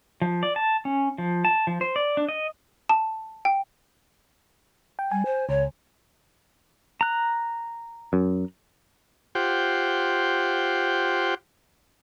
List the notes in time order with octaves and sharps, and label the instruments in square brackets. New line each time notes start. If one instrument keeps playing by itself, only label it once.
[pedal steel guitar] F3
D5
A5
C#4
F3
A5
F3
C5
D5
D4
D#5
[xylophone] A5
G5
[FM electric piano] G5
[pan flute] G3 [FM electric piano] G#5
[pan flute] C5
[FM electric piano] C#2 [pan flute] C#5
[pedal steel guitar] A#5 F#6
[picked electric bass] F#2
[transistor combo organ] F4 G4 C5 F#5 G5